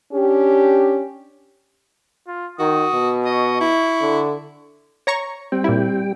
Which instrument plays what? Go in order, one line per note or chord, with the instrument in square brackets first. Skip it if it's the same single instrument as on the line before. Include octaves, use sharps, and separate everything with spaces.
[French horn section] C#4 D4 G4
[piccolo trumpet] F4
[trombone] D#3 [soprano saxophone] F#4 [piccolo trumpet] D#6
[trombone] B2
[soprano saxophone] D#5 [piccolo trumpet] C#6
[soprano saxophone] E4
[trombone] D3
[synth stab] C#5 A#5 C#6
[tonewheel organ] G3 G5 [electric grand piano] C4
[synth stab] A#2 E4